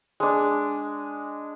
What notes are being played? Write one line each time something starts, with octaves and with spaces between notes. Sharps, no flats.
G#3 D4